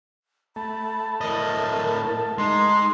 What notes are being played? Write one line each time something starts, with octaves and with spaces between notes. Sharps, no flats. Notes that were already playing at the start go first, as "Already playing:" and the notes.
A3 A5 B5
A2 A#4 D#5
G#3 D#4 C6